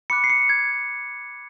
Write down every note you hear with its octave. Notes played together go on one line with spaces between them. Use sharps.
B5 D6 F#6 C#7
C7
C#7
G#6